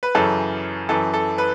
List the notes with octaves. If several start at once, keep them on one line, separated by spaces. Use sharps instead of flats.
B4
F#2 C#3 E3 A4
F#2 E3 A4
A4
B4